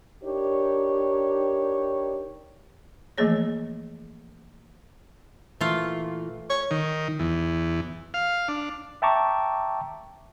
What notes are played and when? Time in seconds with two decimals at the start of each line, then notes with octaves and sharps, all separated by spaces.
0.24 D4 D#4 G4 A#4 C#5
3.18 E3 F3 A3 A#3 G#4 C#5
5.61 A#2 E3 A3 F4
6.50 C#5
6.71 D#3
7.19 E2
8.14 F5
8.48 D4
9.02 E5 G5 A5 A#5 C#6 D6